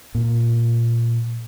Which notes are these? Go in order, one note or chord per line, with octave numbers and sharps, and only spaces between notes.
A#2